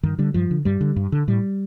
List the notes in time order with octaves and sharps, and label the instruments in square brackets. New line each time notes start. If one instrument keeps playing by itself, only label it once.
[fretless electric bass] G2 D#3
D3 G3
G2 F3
D3
G2 G3
D3
G2
D3
A2 G3